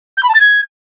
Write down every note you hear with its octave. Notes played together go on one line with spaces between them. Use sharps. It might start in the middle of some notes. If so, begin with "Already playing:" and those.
G6
B5
A5
A6
G#6